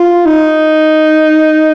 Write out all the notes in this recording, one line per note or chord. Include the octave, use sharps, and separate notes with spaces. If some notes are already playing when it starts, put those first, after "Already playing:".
Already playing: F4
D#4